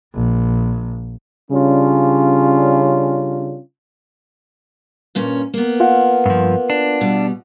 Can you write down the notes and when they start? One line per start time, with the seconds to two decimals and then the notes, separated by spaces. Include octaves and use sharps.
0.14 A#1
1.51 C#3 G3 C#4 D4 F4
5.15 G2 A#2 C#4
5.54 A#3 B3
5.80 F4 F5 F#5
6.26 G2 F3
6.70 D4
7.01 B2 G3